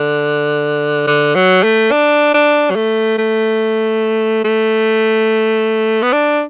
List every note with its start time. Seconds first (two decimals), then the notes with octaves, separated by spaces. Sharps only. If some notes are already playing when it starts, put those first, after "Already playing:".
Already playing: D3
1.07 D3
1.35 F#3
1.63 A3
1.91 D4
2.34 D4
2.70 F#3
2.76 A3
3.18 A3
4.44 A3
6.02 B3
6.13 D4